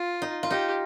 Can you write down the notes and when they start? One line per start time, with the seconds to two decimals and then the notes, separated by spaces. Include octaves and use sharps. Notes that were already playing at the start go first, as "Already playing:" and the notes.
Already playing: F4
0.22 D#4
0.43 F4
0.50 D#4 G4